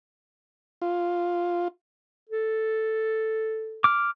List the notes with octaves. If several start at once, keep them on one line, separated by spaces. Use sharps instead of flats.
F4
A4
D6 F6